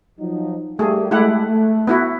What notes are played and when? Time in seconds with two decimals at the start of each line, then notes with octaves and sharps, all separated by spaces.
0.19 F3 F#3 D#4
0.79 G3 A3 A#3 G4 G#4
1.11 G#3 A3 E4 G4 F#5
1.46 A3
1.87 B3 E4 F#4